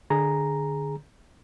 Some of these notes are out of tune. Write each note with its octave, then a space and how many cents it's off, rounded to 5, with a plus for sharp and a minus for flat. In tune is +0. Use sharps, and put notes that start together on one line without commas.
D3 +25 G#4 +0 A#5 +0